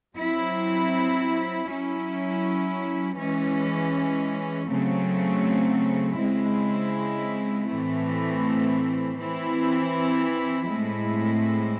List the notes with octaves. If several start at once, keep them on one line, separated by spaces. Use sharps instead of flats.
F#3 C4 E4
F#3 C#4 E4
E3 G#3 C#4
C#3 F#3 A3 C4
C#3 G#3 C4 E4
A2 E3 A3 C4 E4
E3 C4 E4
A2 G#3 C4 E4